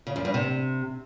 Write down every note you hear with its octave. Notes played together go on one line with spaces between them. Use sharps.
C#3
F#2
G2
C3